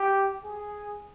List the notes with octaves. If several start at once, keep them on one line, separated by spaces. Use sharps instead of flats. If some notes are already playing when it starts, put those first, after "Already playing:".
Already playing: G4
G#4